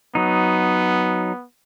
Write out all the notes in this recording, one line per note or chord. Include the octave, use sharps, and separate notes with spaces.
F#3 B3 D#4